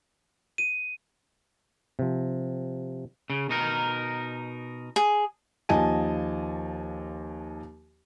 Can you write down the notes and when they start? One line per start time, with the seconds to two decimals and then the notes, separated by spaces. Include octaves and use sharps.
0.58 D#7
1.99 C3 F3
3.30 C#3
3.49 B2 D#4 A#4
4.96 G#4
5.69 D#2 F3 D#5 G#5 A5 D#7